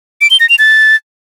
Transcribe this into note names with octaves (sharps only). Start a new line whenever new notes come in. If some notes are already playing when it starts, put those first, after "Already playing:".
D7
G7
A#6
F7
A6